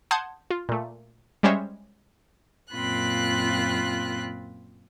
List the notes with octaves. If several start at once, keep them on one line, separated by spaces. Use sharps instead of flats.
F#5 A5 C6 D#6 G6 G#6
F4
A#2 A3
G3 G#3 C#4 C5 C#5 E5
F#2 A#2 C4 F4 B5 F#6